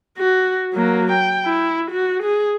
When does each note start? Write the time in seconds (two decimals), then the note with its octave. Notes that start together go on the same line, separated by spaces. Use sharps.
0.18 F#4
0.74 F#3 A#3
1.12 G5
1.46 E4
1.91 F#4
2.23 G#4